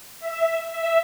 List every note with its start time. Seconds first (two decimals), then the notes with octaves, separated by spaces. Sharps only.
0.20 E5
0.70 E5